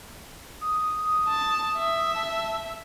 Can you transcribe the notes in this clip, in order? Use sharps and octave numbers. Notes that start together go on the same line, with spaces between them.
D#6
A5
E5
A5